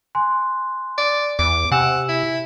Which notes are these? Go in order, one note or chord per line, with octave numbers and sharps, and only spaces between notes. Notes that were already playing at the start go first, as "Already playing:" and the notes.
G#5 C6 F#6
D5
E2 D6
C3 F#5 G#5 E6 E7
E4